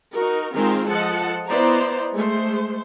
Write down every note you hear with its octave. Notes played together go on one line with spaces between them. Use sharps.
D#4 F#4 A#4
D#3 G#3 C4 F4 A#4 C5
F3 A4 D#5 F#5 A5
B3 E4 C5 D5 D#5 A#5
G#3 A3 C5